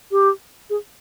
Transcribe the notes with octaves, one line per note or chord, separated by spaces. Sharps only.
G4
G#4